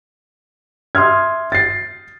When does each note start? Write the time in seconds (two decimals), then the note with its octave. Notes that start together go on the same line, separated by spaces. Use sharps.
0.95 E5 C6 D#6 F6 G#6
1.52 A6 C7